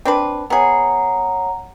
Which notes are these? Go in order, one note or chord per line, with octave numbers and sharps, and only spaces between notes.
C4 D4 B4
B3 G#4 C#5 F#5 A#5